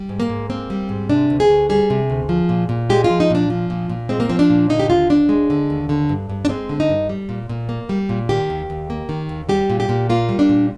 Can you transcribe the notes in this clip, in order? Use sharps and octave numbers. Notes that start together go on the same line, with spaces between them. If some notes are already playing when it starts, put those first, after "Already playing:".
Already playing: G3
G#2
A#3
G#2
A#3 C4
G3
G#2
C3 D4
D2
G#4
D2
G3 G#4
C3
D2
F3
A#2
A#2
G#3 G4
F4
F3
D#4
A#2 D4
F3
A#2
A#2
G#3 C4
A#3
F3 C4
D4
A#2
D3 D#4
G4
D#2 F4
D#2 D4
G#3
D3
D#2
D3
G2
G2
D4
G#3 C4
D3
D#4
G2
G3
A#2
A#2
A#3
G3
A#2
D#3 G4
D#2
D#2
A#3
D#3
D#2
G3 G4
A#2
G4
A#2
A#3 F4
G3
D4
A#2